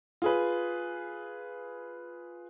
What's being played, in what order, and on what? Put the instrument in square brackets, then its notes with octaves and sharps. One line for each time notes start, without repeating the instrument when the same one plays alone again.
[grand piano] F4 G#4 B4